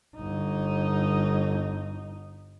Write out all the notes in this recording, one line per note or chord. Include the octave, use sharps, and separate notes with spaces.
G1 D#4